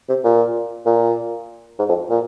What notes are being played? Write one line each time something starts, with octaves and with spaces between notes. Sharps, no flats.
C3
A#2
A#2
G#2
F2
A#2